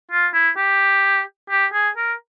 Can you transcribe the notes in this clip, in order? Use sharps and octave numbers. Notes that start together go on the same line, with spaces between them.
F4
E4
G4
G4
G#4
A#4